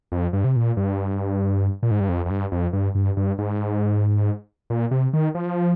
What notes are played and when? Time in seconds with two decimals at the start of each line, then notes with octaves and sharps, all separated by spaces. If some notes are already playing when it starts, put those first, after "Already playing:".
0.12 F2
0.33 G2
0.44 C3
0.56 A#2
0.77 G2
1.83 A#2
1.91 G#2
2.00 G2
2.09 F2
2.26 F2
2.30 G2
2.52 F2
2.73 G2
2.95 G2
3.17 G2
3.38 G#2
4.70 A#2
4.91 C3
5.13 D#3
5.35 F3